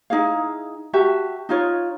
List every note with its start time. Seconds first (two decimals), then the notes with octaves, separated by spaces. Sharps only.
0.10 D#4 E4 G#4 F5
0.93 F#4 G4 E5 A5
1.49 D#4 F4 C#5